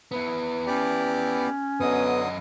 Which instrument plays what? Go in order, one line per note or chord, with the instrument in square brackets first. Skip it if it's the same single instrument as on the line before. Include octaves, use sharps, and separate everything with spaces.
[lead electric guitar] B3 E4
[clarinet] C#4 [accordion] G4 D5
[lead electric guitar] F#2 D#5 [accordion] D3 F#3 D#6 [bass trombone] B3